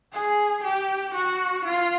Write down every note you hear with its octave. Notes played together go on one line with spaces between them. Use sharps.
G#4
G4
F#4
F4